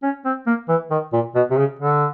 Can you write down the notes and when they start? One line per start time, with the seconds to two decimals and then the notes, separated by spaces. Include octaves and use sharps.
0.03 C#4
0.25 C4
0.47 A#3
0.68 E3
0.91 D#3
1.13 A#2
1.35 B2
1.50 C3
1.57 C#3
1.79 D3